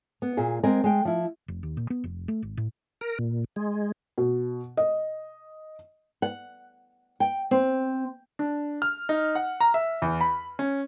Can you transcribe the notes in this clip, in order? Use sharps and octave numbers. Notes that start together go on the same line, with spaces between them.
B3
A#2 G#4
G#3 C4 A#4 G#5
G#3 G5
F3 E4
F1
D#2
A#2
B3
F1
A3
G#1
A2
A#4
A#2
G#3
B2
D#5
F#5
G5
C4
D4
F6
D#4
F#5
A#5
E5
E2
B5
C#4